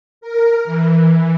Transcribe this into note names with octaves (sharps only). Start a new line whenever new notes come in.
A#4
E3